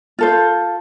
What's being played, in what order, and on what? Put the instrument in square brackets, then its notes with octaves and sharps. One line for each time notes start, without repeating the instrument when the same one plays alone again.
[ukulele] F4 A4 C5